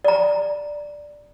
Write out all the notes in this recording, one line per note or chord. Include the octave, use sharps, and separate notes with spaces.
D5 A#5